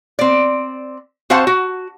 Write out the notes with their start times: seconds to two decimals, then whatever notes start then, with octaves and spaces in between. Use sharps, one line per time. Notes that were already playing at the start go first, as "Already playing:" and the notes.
0.19 C4 D5
1.30 C4 F#4 C5 F5 F#5 A5
1.47 F#4